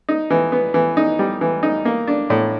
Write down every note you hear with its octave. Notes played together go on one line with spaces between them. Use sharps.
D#4
E3
B3
E3
D#4
G3
E3
D#4
A#3
D4
A2